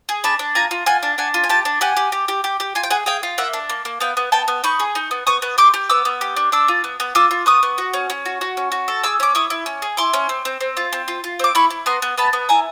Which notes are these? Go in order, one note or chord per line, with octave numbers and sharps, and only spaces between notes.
G#4
D4 A5 B5
D4
F4 G#5 A#5
F4
F4 F#5 G#5
D4
D4 F#5 G#5
F4
G#5
G4 G5 A5
D4
G4 F#5 G#5
G4
G4
G4
G4
G4
F4 G#5
G5
G#4 F#5 G#5
G#4 F5 G5
F4
A#3 E5 F#5
D4
A#3
A#3
B3 F5 G5
B3
B3 G5 A5
B3
D#4 B5 C#6
G#4
D#4
B3
B3 C#6 D#6
B3
G4 C6 D6
G4
B3 D6 E6
B3
G4
D4
D4 D6 E6
F4
B3
B3
F4 D6 E6
F4
B3 C#6 D#6
B3
F#4
C#4
C#4
F#4
F#4
C#4
F#4
A4
G#4 D6 E6
C#4 D6
E4 C#6 D#6
E4
C#4
G#4
E4 C6 D6
C#4
C4
C4
C4
F4
C4
F4
F4
C4 D6
E4 B5 C#6
E4
B3 A#5 C6
B3
B3 A5 B5
B3
E4 G#5 A#5